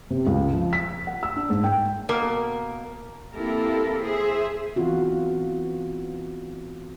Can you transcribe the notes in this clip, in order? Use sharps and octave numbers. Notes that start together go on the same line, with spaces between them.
C3
C#2
F3
B6
F#5
E6
D4
G#2
G5
B2 A#3 A#4
A#3 C4 E4 G4 A4 A#4
G#4 C5 E5
E3 B3 C4 F4 F#4